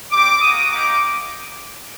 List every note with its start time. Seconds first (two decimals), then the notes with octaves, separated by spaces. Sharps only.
0.11 G3 C4 G4 D6
0.42 A#3 F#4 D#6
0.71 A#3 D#4 G4 D6